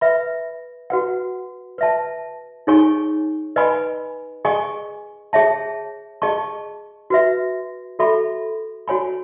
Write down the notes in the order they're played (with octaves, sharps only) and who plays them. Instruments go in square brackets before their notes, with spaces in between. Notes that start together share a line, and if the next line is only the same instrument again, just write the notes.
[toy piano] B4 E5 B5
F#4 B4 F#5
B4 E5 A5
D#4 G#4 C#5 G#5 C#6
B4 D#5 G#5 B5
G#4 D#5 G#5 C#6
G#4 C#5 E5 A5
G#4 D#5 A5 C#6
F#4 B4 E5
F#4 A4 E5 B5
F#4 C#5 G#5 B5